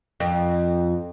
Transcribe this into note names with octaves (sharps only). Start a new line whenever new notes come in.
F2